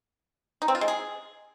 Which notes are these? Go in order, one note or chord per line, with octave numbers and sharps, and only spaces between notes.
D#4
C4
F4
G#3
G#4